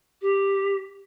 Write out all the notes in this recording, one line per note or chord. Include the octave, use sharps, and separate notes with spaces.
G4